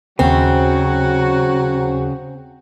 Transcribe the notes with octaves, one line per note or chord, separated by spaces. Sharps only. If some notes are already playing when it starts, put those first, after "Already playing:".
D#2 C#3 F#3 C4 F#4 C5